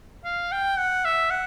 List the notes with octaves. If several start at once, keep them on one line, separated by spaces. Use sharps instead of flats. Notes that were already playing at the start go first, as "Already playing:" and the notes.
F5
G5
F#5
E5
F#5